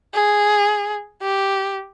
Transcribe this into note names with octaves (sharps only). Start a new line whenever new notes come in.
G#4
G4